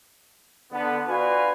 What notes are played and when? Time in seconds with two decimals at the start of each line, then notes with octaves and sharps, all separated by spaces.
0.72 D3 B3
1.09 F4 F#4 B4 D5 F5 G#5